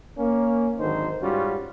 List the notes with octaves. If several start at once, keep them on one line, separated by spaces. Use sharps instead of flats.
A#3 C#4
G#1 D3 D#3 F#3 D#4 C5
G#2 G3 C#4 F4 F#4